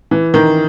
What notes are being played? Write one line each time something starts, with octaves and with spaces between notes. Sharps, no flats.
E3
D#3